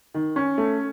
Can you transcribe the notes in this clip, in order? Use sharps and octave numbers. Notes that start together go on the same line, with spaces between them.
D#3
C#4
A3